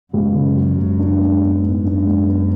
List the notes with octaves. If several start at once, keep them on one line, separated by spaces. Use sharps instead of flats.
C#2 F#2
C#3
F#3
C#2
D4
G#3
B3
G#2
F#2 D4
G#3
B3